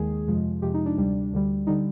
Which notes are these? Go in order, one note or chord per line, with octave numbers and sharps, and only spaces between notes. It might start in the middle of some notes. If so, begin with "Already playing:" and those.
Already playing: D#2 D#3 G#3 G#4
F2 C3 F3 G#3
F2 C3 F3 G#3 G4
D#4
D4
D2 C3 G3
D2 D3 G3
D3 G3 D#4